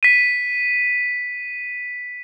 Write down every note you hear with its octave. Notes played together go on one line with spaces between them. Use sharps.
B6 D#7